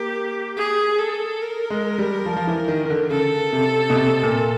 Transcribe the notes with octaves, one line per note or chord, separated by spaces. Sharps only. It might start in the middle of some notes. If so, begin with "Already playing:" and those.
Already playing: A#3 G4
G#4
A4
A#4
G#3
G3
F3
F3
E3
D#3
D#3
D3
C#3 A4
C3
B2
C3
A#2